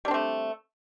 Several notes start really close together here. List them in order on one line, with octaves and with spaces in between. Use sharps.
G3 D4 C4 A3